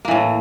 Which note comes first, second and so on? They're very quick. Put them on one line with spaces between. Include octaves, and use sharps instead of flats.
A#3 E3 A2